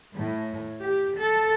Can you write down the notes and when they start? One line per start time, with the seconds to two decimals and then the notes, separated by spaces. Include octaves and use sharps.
0.15 A2
0.81 G4
1.19 A4